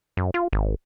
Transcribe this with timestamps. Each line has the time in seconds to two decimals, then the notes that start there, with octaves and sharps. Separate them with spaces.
0.17 F#2
0.34 F4
0.53 G#1